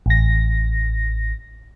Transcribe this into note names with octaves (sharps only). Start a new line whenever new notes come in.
A1 A#6